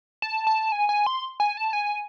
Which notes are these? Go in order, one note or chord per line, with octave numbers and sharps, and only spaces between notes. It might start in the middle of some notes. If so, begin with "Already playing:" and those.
A5
A5
G#5
G#5
C6
G#5
A5
G#5